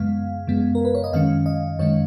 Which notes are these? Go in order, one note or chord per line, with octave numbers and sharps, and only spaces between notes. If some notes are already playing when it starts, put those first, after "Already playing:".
Already playing: F#2 C#3 G#3 B3 F5
F#2 C#3 G#3 B3
A#4
B4
C#5
D#5
F#2 D#3 G#3 C#4 F5
D#5
F#2 D#3 G#3 C#4 C#5